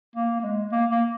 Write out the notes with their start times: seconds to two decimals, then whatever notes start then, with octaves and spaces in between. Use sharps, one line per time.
0.16 A#3
0.40 A#3
0.44 G#3
0.72 A#3
0.91 A#3